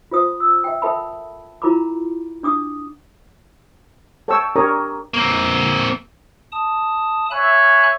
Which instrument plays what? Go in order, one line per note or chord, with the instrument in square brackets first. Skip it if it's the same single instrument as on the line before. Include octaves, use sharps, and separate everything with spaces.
[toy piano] F4 C5 D#6
E6
E5 G5
A4 A#4 E5 G5 A5 B5
E4 F4 A#4 A#5 B5 D6
D4 D6 D#6
[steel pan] A4 C#5 G5 A5 C#6 E6
D4 G4 A#4 C#5 A#5 D#6
[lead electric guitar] A#3 C4
[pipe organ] A5 D#6
[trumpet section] C#5 E5 [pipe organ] G#5 B5 F#6